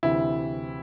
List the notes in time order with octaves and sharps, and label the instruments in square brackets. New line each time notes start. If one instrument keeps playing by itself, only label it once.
[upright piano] D2 C3 E3 [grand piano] E4